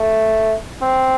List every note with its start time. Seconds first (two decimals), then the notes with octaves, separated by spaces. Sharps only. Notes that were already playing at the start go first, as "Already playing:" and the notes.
Already playing: A3
0.82 C4